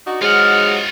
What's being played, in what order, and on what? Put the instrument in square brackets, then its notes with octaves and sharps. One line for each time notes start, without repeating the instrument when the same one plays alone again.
[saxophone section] D4 D#4 F#4
[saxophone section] G#2 F#3 G#3 [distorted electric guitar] F4 F#5 [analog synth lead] F6